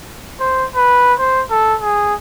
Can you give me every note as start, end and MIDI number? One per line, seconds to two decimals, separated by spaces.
0.40 0.66 72
0.76 1.14 71
1.19 1.43 72
1.51 1.76 69
1.82 2.14 68